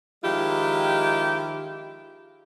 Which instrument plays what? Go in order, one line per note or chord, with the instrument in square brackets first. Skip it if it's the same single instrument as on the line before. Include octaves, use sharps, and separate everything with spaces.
[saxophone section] D#3 F3 G#3 E4 F4 G4